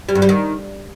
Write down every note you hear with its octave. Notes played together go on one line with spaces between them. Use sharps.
G3
G2
G3
D#3